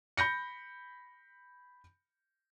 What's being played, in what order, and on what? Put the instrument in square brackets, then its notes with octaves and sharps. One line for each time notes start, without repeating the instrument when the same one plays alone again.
[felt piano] B5 G6 A#6 C#7